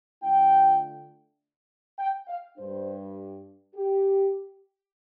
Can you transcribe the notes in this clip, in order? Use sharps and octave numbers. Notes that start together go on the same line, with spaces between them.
D3 A3 D4 F4 G5
G5
F5
G2 G3 D4 C5
G4